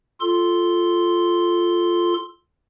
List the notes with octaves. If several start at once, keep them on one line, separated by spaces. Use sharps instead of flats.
F4 A4 C6